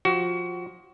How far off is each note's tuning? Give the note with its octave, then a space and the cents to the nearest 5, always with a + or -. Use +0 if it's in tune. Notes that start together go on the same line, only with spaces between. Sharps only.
F3 +20 F#4 +25